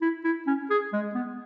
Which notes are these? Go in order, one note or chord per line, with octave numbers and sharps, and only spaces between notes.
E4
E4
C#4
G#4
G#3
B3